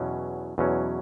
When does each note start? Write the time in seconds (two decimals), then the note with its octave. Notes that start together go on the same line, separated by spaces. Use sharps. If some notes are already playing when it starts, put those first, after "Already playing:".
Already playing: E2 B2 F#3 C#4
0.58 E2 B2 F#3 C#4